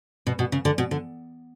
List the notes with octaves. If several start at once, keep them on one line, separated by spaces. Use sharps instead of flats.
B2
B2
C#3
D3
B2
D3